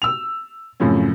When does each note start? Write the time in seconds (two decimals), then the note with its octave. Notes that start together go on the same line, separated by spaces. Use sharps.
0.02 E6 F7
0.80 F#2 A2 C#3 F3 C4 C#4